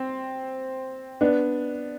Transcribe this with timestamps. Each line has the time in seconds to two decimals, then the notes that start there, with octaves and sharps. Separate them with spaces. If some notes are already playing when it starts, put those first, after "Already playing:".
Already playing: C4
1.21 B3 D4